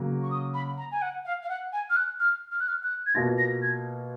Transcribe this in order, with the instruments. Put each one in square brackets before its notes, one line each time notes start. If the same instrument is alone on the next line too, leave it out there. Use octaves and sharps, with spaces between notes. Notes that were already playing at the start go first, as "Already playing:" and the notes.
Already playing: [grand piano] C#3 F#3 A#3
[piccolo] C#6
D#6
B5
A#5
G#5
F#5
F5
F5
F#5
G#5
F6
F#6
F6
F6
F#6
F6
F#6
G#6
[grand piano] B2 A#3 F4 [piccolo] A#6
[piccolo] A#6
G#6